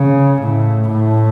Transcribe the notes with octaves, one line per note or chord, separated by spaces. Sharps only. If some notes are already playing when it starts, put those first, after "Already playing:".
Already playing: C#3
A2
A2